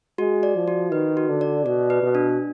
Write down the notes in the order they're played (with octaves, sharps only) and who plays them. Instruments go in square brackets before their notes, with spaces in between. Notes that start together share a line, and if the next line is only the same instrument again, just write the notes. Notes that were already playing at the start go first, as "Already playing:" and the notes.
[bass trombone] G#3 [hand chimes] F#4
[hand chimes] D5
[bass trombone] F3
[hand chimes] F#4
[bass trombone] D#3 [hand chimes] B4
[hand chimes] F#4
[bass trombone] D3
[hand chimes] D5
[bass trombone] B2 [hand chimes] D5
[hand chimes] B4
[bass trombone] B2
[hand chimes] D4